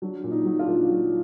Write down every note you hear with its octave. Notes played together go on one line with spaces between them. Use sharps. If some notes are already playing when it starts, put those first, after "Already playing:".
F#3 D4
A#2
D#4
F#3
D4 F4
A#2
F#3